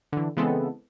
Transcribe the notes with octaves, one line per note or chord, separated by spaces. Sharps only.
D3 E3
C#3 E3 G#3 B3 C4 A4